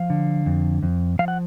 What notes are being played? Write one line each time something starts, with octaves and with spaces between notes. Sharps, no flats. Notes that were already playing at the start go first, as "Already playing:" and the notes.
Already playing: F3 F5
D3
F2
F2
F3 F5
F#5